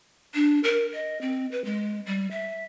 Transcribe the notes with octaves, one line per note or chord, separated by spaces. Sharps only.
D4
A#4
D#5
C4
B4
G#3
G3
E5